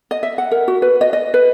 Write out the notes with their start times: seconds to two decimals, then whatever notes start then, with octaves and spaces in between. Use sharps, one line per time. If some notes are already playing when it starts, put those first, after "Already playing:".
0.11 D#5
0.23 E5
0.38 F#5
0.51 A#4
0.68 F#4
0.82 B4
1.01 D#5
1.13 D#5
1.34 B4